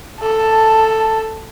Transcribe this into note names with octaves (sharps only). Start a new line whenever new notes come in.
A4 A5